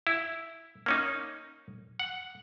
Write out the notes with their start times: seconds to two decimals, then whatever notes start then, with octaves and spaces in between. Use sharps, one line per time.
0.07 E4
0.86 A#3 C#4 D#4
2.00 F#5